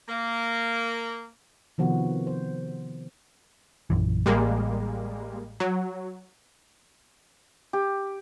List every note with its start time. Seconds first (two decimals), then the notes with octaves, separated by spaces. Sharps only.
0.09 A#3
1.78 C3 D#3 F3 B3 F#4
2.27 C5
3.90 A#1 F#2 E3
4.26 A1 G3 G#3 A#3
5.60 F#3
7.73 G4